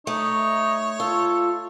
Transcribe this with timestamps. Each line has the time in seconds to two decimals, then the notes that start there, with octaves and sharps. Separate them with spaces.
0.07 A3 D#4 C#5
1.00 F4 A4